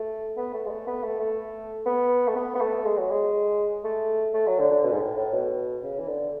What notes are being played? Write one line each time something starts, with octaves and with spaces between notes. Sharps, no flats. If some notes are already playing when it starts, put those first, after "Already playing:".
Already playing: A3
B3
A3
G#3
A3
B3
A3
A3
B3
A3
B3
B3
A3
G#3
F#3
G#3
A3
A3
F#3
D3
D3
B2
G#2
A2
A2
B2
C#3
E3
D3